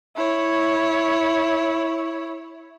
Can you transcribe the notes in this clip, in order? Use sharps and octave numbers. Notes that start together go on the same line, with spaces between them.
E4 C#5